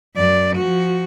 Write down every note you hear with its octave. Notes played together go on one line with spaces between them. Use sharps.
F#2 D5
F3 F#4